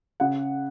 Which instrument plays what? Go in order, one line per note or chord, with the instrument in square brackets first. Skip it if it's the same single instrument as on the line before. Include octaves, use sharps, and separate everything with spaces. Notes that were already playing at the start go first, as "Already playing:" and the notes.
[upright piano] C#3 F#5